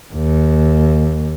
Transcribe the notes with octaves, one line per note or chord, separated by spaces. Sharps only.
D#2